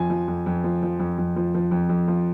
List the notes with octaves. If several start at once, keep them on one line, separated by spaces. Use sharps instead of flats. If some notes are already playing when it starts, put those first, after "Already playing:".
Already playing: F2 F3 G#5
F3
F2
F2
F3
F3
F2
F2
F3
F3
F2
F2
F3